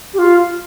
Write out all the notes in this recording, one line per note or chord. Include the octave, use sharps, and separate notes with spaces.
G4
F4